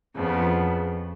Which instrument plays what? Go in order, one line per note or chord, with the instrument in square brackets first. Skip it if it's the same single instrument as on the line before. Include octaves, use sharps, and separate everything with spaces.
[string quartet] F2 C#3 F3 B3